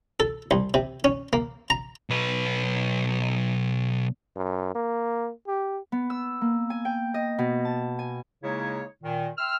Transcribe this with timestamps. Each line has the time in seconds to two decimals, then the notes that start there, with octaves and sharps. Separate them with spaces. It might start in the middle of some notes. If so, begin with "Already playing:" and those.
0.20 A4
0.51 C2
0.74 C3
1.04 C#4
1.33 A#3
1.70 A#5
2.10 B1 B4
4.36 F#2
4.75 A#3
5.47 G4
5.92 B3
6.10 E6
6.41 A#3
6.70 G#5
6.85 G5
7.14 D#5
7.39 B2
7.65 A5
7.99 G#5
8.43 C#3 G#3 A#3 D#4 E4 C#5
9.03 A#2 D#3
9.38 E5 G5 C6 E6 F6